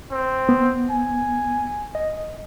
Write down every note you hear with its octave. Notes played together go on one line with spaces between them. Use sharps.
C4
B3
G#5
D#5